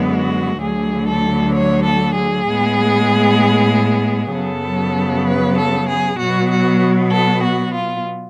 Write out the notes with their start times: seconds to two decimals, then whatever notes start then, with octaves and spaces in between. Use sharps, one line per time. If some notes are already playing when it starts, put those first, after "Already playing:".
Already playing: F#2 D3 G#3 B3
0.14 F#4
0.61 D2 D3 F#3 A3 G#4
1.08 A4
1.54 C#5
1.85 A4
2.16 G#4
2.47 A2 G#3 B3
4.33 F#2 C#3 F#3 B3 A4
5.26 B4
5.57 A4
5.88 G#4
6.19 B2 F#3 B3 F#4
6.50 F#4
7.12 A4
7.43 F#4
7.74 F4